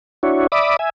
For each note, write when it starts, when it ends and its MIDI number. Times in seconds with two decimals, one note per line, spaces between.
0.23 0.47 62
0.23 0.47 64
0.23 0.47 66
0.23 0.47 73
0.52 0.77 74
0.52 0.77 76
0.52 0.77 83
0.52 0.77 86
0.52 0.77 87
0.79 0.90 76
0.79 0.90 80